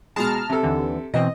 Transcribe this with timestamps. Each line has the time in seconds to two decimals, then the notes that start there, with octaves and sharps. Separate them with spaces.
0.16 B2 G#3 A5 A#5 F6
0.49 C3 A4
0.63 D#2 D3 E3
1.14 B2 E3 C4 D#5